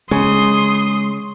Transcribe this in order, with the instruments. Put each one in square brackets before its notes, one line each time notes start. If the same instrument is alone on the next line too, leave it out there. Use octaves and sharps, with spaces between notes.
[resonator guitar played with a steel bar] C#3 [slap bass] G#3 [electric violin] C6 D#6